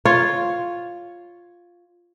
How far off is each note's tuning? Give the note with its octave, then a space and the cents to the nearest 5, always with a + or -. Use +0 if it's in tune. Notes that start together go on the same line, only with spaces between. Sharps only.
F4 +0 C#5 +0